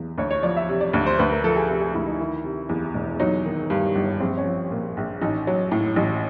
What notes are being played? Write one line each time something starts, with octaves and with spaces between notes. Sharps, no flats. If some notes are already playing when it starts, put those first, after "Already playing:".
Already playing: E2
D2 C#5
C#5
F3 D5
E5
C3
D5
D2
C5
D2 B4
A#4
F3 A4
G#4
C3 A4
G#4
D2 E4
D#4
D#3 E4
C3
E2
E1
F#3 D#4
D#3
G2
G1
A#1 C4
C#4
F3
A#2
A#1
A1 D#4
F#3
A2
A1